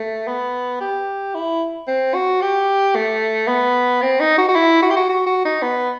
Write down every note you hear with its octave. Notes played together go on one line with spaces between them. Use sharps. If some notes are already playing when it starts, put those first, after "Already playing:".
Already playing: A3
B3
G4
E4
C4
F#4
G4
A3
B3
C4
D#4
F#4
F#4
E4
F#4
G4
F#4
F#4
F#4
D#4
B3